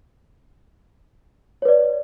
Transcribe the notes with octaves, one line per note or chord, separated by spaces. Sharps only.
B4 C#5 D5